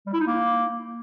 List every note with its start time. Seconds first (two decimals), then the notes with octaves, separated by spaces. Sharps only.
0.06 G3
0.13 E4
0.20 D#4
0.27 A#3